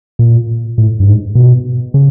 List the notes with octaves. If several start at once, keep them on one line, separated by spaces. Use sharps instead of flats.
A#2
A2
G2
G#2
B2
C#3